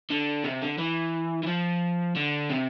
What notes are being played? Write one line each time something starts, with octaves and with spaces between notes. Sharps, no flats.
D3
C3
D3
E3
E3
F3
D3
C3